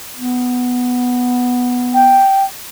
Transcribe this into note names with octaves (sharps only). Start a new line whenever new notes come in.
B3
G5